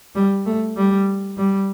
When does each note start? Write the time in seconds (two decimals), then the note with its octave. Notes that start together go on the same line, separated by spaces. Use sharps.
0.15 G3
0.46 A3
0.76 G3
1.37 G3